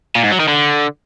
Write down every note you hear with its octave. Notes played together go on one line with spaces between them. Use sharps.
A#2
G#2
F#3
D#3
D3